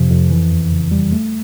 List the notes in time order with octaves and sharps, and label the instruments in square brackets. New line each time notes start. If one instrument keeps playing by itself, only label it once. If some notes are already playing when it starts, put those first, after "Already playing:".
Already playing: [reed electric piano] F2 C3 F3
F2
E3
E2
C#3
G3
A3